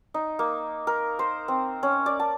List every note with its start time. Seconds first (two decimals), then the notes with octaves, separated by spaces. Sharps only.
0.14 D#4
0.39 A#3
0.87 A#4
1.19 C5
1.48 C4
1.83 C#4
2.06 D5
2.20 A5